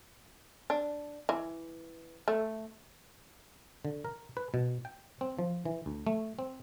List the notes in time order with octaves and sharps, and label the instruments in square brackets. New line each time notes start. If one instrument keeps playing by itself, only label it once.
[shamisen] D4
E3
A3
[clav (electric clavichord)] D3
A#4
B4
B2
G5
C4
F3
E3
D2
A3
C4